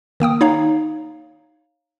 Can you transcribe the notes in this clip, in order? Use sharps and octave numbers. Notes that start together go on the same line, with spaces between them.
D#3 A#3 G5 D#6
D#4 C#5 F5 A#5